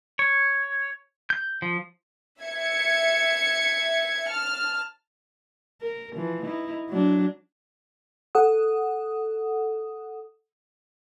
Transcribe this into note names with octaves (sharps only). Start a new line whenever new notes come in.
C#5
G6
F3
E5 G#6 C#7
A5 F6
A#4
E3 F3
D#4 E4
F#3 D4
A4 F#5 D#6